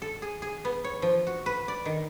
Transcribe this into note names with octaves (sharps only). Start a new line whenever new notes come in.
A4
G#4
G#4
B3
C#5
F3
F#4
B4
D5
D#3